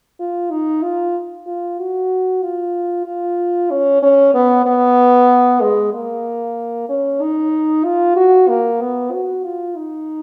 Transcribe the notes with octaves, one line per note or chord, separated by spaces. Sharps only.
F4
D#4
F4
F4
F#4
F4
F4
C#4
C#4
B3
B3
G#3
A#3
C#4
D#4
F4
F#4
A#3
B3
F#4
F4
D#4